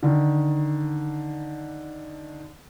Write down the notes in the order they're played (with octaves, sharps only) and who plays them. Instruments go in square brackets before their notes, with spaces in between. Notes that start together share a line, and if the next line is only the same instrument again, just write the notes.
[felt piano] D3 D#3